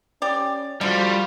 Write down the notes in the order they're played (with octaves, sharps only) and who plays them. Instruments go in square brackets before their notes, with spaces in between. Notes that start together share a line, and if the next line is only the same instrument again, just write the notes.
[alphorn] C#4 [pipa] G4 D5
[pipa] D3 [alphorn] F3 [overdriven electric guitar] G3 [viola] F4 F#4